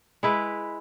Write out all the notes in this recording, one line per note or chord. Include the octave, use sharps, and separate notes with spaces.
G#3 E4 B4